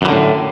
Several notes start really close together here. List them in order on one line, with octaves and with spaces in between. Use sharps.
F#2 E3 D3 A2